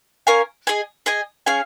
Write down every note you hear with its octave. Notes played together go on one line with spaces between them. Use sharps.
C#4 A#4 F5 G#5
G#4 D#5 G#5
G#4 D#5 G#5
C#4 G#4 F5 G#5